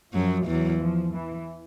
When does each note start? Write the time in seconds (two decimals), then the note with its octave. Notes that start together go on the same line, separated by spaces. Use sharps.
0.13 F#2 F3 F#3
0.47 E2 E3 F#3
0.81 F3
1.13 E3